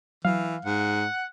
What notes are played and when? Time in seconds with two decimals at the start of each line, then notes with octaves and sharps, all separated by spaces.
0.25 E3 F#3 F5
0.65 G#2 F#5